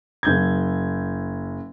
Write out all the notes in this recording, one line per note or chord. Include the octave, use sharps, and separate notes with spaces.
F#1 G6 G#6